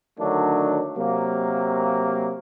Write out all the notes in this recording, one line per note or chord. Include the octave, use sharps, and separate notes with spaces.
D3 D#3 F#3 A3 D4
C3 F#3 A#3